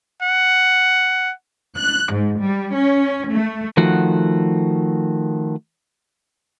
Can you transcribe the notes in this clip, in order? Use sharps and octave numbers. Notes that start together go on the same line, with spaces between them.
F#5
F#6
G#2
G3
C#4
A3
D#3 F3 A3 F#4 F#5